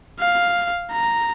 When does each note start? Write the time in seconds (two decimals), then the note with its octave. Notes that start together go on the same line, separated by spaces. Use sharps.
0.20 F5
0.92 A#5